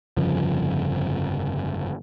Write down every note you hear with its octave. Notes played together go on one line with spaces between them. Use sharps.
G1 F2 C#3 F3